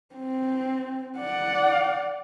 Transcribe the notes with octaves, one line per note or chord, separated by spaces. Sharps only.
C4
D5 F#5